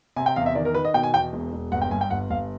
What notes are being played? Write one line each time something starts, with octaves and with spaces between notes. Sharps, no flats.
C3 G#5
G5
E2 F5
E5
D#3 D5
A#4
D#3 B4
D#5
B2 G5
G#5
E2 G5
E1
E1
G1 F#5
G5
G2 G#5
G5
G1 F#5
G1 F5